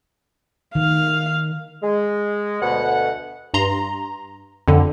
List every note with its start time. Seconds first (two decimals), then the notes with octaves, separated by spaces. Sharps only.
0.75 D#3 F5
1.83 G#3
2.62 D2 B2 F#5
3.54 G2 A#5 C6
4.68 F2 D3